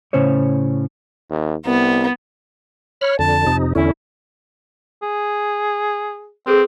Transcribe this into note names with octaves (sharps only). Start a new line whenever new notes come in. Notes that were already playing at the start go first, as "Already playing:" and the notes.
A2 C#3 C#4 C5 C#5
D#2
C2 B3
C#5 B5 F6
F2 D3 A5
F2 C3 D#4
E2 D3 C#4 E4
G#4
C4 G#4 A4 B4